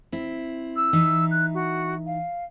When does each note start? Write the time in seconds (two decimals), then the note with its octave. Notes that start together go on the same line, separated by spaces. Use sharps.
0.12 C4 E4
0.76 E6
0.93 E3 D#4 E5
1.31 F#6
1.54 F#4
2.06 F5